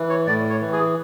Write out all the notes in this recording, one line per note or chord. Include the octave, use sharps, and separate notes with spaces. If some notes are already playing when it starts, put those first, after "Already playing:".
Already playing: E3
C#5
A2 D5
C#5
E3
G#4